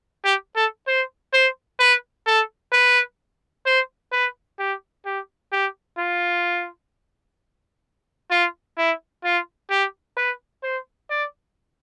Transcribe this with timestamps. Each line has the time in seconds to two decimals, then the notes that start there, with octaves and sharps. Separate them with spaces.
0.25 G4
0.56 A4
0.87 C5
1.33 C5
1.80 B4
2.27 A4
2.72 B4
3.66 C5
4.12 B4
4.59 G4
5.05 G4
5.52 G4
5.98 F4
8.31 F4
8.77 E4
9.24 F4
9.70 G4
10.17 B4
10.63 C5
11.10 D5